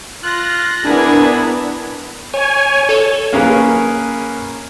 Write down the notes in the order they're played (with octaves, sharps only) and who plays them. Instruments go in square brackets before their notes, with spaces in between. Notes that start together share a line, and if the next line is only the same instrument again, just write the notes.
[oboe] F4 [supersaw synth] F#6 A#6
[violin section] B3 A#4 [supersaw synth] D4 [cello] E4 [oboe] G#4
[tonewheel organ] C#5 G#5
[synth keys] A4 C#5
[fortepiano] A#3 C#4 G#4 A#4 B4